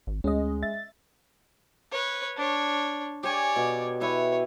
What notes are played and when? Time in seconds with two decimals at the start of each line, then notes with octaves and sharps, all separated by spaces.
0.07 G#1
0.24 D2 G#3 C#4 D#5
0.62 E5 A6
1.92 B4 C#5
2.37 D4 C#5
3.23 G4 C#5 D5 G#5
3.56 B2
4.01 E4 B4 C#5